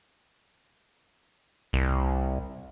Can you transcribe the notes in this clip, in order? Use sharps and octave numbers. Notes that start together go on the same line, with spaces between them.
C2